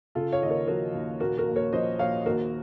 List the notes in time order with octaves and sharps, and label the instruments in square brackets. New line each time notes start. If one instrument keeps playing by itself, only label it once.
[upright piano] C#3 F4 A4
C#5 F5
D#2 D#5
A#4 C#5
F3 F#4 A#4
D#2
A#2 F#4 A#4
F#4 A#4
A#1
A#4 C#5
F3 C5 D#5
A#1 C#5 F5
D#2 F#4 A#4